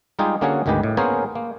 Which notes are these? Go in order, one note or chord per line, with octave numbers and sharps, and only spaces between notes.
G3 G#3 D#4 F4 G4 G#4
D3 A#3 C#4 F#4 G#4 F#5
G#1 D2 D#3 G#3 G4 B4
A2
A#3 B3 C#4 G#4 A#4 C5
A#3